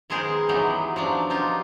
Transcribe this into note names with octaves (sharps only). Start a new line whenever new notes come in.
D#3 G#3 B3 G#4 A#4 C5
E3 F#3 B3 D#4 G4
F3 F#3 D4
D#4 F4 G4